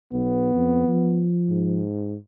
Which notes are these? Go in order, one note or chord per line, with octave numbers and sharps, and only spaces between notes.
B1 B3
F2
F3
G#2